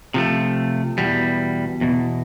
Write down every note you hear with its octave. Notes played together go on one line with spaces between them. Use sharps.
C3 F3 A3
E2 B2 G3
E2 B2